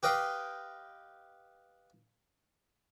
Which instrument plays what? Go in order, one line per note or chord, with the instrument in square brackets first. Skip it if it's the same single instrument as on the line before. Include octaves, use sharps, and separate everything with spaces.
[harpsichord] G4 B4 D#5 F5 G5